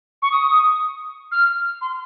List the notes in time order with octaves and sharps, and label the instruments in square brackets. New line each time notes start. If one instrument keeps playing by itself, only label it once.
[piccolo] C#6
D#6
F6
C6